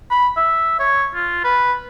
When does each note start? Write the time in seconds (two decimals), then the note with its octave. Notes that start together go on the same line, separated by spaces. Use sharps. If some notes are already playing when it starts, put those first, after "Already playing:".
0.11 B5
0.37 E5
0.80 C#5
1.15 F4
1.44 B4